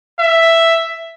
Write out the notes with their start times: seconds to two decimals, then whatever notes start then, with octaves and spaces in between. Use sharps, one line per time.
0.19 E5